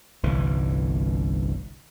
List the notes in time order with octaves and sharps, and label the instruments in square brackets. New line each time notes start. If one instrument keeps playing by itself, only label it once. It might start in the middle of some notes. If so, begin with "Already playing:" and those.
[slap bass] G1 C2 E3